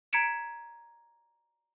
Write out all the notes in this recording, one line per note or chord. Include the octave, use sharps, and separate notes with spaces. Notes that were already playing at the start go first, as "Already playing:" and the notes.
A#5 G#6 B6 C#7 D7 E7